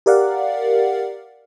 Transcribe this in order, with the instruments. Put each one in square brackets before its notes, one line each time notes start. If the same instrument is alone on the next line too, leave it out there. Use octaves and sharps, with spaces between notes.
[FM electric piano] G4 A#4 D5 F5 F#5